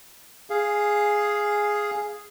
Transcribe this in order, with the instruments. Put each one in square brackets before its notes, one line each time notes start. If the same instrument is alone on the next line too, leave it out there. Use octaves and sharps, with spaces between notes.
[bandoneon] G#4 F5